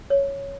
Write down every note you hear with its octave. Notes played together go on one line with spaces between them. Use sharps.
C#5